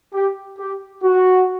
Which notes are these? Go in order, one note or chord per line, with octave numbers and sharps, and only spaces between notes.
G4
G4
F#4